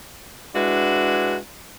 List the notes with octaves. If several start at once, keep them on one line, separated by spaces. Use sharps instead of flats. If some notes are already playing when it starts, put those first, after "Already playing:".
G#3 D4 E4 F#4 B4